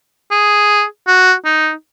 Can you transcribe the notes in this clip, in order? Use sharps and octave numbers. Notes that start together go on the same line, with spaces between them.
G#4
F#4
D#4